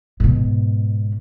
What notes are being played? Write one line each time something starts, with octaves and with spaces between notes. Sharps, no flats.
G#2 B2